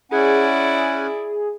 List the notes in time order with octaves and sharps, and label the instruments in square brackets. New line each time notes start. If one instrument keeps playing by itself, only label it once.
[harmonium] C#4 F#5 G#5 [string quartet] E4 D5 [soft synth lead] G#4